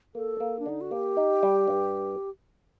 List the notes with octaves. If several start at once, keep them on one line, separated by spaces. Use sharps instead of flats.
A#3 A4
A#3
D4
D3 D#4
F#4
A#3 G4
D#4
G3
G2